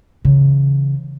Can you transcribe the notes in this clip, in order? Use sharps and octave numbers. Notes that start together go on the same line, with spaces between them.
C#3 E3